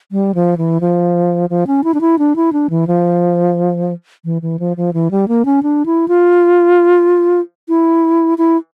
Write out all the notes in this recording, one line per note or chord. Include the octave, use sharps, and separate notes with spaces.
G3
F3
E3
F3
F3
C#4
E4
D4
E4
D4
E4
D4
E3
F3
E3
E3
F3
F3
E3
G3
A#3
C#4
D4
E4
F4
E4
E4